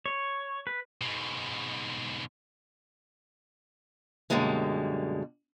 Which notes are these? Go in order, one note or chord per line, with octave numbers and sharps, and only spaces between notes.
C#5
B4
G#2 B2
F#2 B2 D3 G3 G#3 A#3